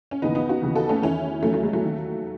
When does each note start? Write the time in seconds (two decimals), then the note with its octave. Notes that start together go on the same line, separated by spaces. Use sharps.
0.11 C#4
0.22 D#2 C#3 E3 B3 D#4
0.35 B3 D#4
0.49 D#4 F#4
0.62 D#2 C#3 E3
0.75 F#4 A4
0.89 A3 C#4
1.02 E2 D#3 C#4 E4
1.42 E2 D#3 F#3 A3
1.53 F#3 A3
1.63 G#3
1.73 F#3 A3
1.83 D#2 D#3